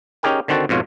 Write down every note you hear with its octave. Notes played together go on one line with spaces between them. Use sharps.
C#4 D#4 G4 G#4 A#4 G5
D3 D#3 C4 F#4 A5
F2 G#2 B2 F4 C#5